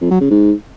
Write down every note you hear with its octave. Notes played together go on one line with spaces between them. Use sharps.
F2
F#3
C#3
G#2